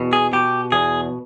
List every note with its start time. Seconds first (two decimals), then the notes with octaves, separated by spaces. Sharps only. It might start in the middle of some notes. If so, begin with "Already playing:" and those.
Already playing: E2 B2
0.13 G#4
0.33 B2 G4
0.72 E2 G#4